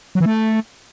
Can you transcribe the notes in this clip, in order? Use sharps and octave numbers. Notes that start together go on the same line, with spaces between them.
F#3
E3
A3